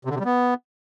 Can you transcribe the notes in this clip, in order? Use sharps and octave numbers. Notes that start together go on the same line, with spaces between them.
C3
D3
C3
G3
B3